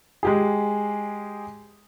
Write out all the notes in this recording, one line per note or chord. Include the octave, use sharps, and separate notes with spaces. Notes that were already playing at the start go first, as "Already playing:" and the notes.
G#3 G4 G#4